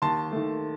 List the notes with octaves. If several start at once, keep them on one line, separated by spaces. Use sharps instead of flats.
D#2 A5 C6
D#3 A3